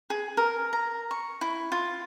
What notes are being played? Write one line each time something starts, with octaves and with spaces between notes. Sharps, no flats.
G#4
A#4
A#5
C#6
E4
F4